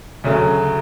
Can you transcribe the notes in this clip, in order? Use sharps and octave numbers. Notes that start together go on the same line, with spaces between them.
D2 C#3 F#3 A3